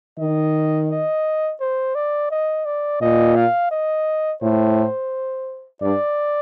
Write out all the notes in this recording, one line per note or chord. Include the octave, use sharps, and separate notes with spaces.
D#3 D#5
D#5
C5
D5
D#5
D5
A#2 D#5
F5
D#5
A2 C5
G2 D5